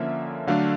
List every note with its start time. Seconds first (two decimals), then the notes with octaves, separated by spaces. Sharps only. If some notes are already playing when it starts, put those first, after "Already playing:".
Already playing: D3 F3 A#3 C#4 E5
0.47 D3 F#3 A3 D4 F5